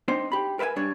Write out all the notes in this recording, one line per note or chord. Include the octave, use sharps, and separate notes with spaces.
C4 D4 D#4 C5
G4 B5
A#4 B4 E5 G5 G#5
G2 G3 D4 C#5